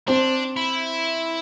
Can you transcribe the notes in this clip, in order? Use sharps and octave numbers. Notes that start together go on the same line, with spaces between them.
C4 D4 C5
E4